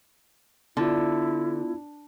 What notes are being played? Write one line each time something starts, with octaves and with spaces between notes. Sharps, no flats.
D3 B3 E4 F4